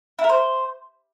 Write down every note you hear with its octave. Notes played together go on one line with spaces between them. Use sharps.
E4
A#4
C5